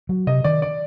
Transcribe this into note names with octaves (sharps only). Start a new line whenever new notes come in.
F#3
C3 D#5
D#3 D5
D5